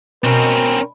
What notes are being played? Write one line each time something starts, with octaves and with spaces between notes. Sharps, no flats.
B2 C4 C#4 A#4